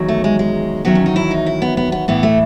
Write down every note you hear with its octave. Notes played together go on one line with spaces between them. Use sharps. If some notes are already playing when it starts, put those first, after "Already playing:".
Already playing: E2 D#3 F#3
A3
G#3
G#3
E2 D#3 F#3 B3
C#4
D#4
E4
D#4
E4
B3
B3
B3
A2 E3 B3
A3